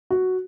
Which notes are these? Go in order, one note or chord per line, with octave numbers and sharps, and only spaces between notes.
F#4